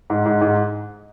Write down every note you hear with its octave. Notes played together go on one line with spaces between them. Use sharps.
G#2
G#2
G#2